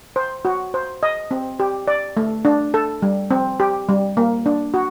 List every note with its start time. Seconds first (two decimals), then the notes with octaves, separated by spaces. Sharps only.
0.16 C5
0.45 F#4
0.74 C5
1.03 D#5
1.31 C4
1.60 G4
1.88 D5
2.17 A3
2.45 D4
2.74 A4
3.02 G3
3.31 C4
3.60 G4
3.89 G3
4.17 A#3
4.46 D4
4.74 F#4